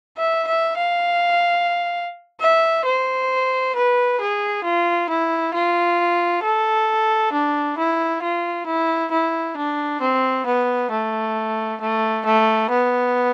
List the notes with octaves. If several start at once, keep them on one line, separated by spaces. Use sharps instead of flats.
E5
E5
F5
E5
C5
B4
G#4
F4
E4
F4
A4
D4
E4
F4
E4
E4
D4
C4
B3
A3
A3
A3
B3